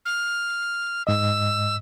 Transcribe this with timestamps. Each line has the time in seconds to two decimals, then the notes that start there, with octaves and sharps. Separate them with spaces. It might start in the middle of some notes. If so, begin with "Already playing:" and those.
0.06 F6
1.07 G#2 D#5 E6